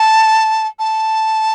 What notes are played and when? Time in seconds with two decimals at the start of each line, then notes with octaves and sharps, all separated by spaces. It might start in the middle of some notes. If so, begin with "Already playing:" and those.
Already playing: A5
0.79 A5